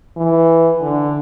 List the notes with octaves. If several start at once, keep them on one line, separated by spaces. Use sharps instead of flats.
E3
D3